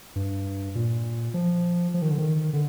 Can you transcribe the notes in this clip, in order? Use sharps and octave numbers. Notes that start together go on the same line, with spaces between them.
G2
A#2
F3
F3
D#3
D3
D#3
D3